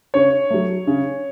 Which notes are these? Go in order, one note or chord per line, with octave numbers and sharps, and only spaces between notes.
C#3 C#5
F#3 A3
C#3